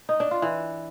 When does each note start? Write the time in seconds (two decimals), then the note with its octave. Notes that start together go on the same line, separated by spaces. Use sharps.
0.09 D#4
0.20 D4
0.31 F4
0.42 E3